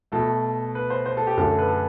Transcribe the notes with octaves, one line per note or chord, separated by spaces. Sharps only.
B2 A3 A4
B4
C5
C5
A4
G4
F#2 D3 A3 A4
B4
A4